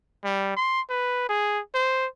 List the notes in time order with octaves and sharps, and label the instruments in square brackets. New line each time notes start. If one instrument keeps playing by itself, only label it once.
[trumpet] G3
C6
B4
G#4
C5